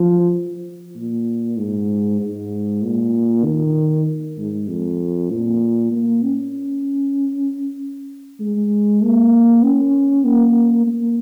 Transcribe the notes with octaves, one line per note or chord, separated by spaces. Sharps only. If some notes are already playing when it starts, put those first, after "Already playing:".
Already playing: F3
A#2
G#2
G#2
A#2
D#3
G#2
F2
A#2
A#3
C#4
G#3
A#3
C#4
A#3
A#3